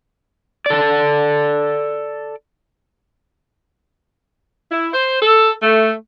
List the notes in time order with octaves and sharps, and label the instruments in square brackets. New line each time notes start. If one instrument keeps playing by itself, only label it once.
[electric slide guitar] A4 D5
[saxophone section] E4
C5
A4
A3